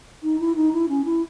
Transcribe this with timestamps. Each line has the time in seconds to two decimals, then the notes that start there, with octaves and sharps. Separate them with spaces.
0.23 D#4
0.39 E4
0.56 D#4
0.73 E4
0.89 C#4
1.05 E4